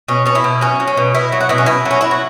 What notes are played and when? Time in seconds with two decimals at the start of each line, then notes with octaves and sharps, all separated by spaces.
0.08 B2 C#4
0.26 B2 C#4
0.35 E4
0.44 B2
0.61 F#3 C#4
0.80 F#3
0.88 C#4
0.97 B2
1.14 B2 E4
1.32 F#3
1.41 F#4
1.49 B2 E4
1.58 C#4
1.66 B2 E4
1.85 F#3
1.91 C#4
2.01 F#3 E4
2.11 F#4